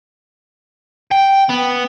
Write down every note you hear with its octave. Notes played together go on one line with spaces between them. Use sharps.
G5
B3